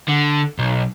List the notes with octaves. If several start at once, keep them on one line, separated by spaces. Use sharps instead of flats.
D3
B1